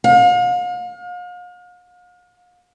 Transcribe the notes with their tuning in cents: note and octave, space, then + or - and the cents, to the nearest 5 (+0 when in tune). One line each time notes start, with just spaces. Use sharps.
F5 +40